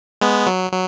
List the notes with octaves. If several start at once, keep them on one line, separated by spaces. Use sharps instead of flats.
G#3 B3
F#3
F#3